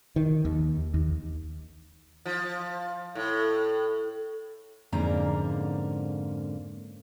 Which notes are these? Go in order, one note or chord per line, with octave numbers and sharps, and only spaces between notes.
D#3
D#2
D#2
F3
A2
F2 G#2 D3 A#3 C#4 A#5